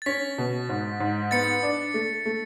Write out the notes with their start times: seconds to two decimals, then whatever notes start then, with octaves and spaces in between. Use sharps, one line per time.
0.02 A6
0.06 C#4 B6
0.38 B2
0.69 G#2
1.00 G#2
1.31 B3 A6 C#7
1.63 D4
1.94 A3
2.26 A3